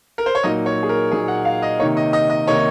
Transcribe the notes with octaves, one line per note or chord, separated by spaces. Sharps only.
A#4
C5
C#5
A#2 F#3 A#3 D#4 D#5
C#5
G#4
A#4
A#2 F#3 A#3 D#4 G#4
F#5
F5
D#5
C3 D#3 A#3 D#4 C#5
D#5
D#5
D#5
C3 D#3 A#3 D#4 C#5